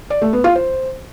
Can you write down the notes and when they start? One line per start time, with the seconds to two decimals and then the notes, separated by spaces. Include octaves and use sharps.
0.10 D5
0.22 A3
0.33 B3
0.44 F4
0.55 C5